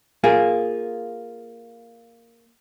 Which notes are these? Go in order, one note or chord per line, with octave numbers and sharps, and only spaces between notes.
A#3 F4 G#4